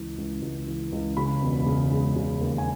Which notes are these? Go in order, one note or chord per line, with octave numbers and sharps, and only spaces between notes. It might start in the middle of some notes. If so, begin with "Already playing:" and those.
Already playing: C#2 E3
C#2
C#2
E3
C#2
C#3 B5
E1
C#3
G#3
C#3
D#2
G#5